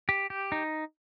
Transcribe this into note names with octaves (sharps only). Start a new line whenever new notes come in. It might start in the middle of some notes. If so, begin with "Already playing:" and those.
G4
G4
D#4